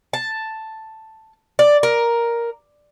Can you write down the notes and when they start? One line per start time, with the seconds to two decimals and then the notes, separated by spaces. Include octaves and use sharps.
0.13 A5
1.59 D5
1.83 A#4